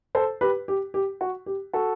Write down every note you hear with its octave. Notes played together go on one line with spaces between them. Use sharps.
A4 C5
G4 B4
G4
G4
F#4
G4
F#4 A4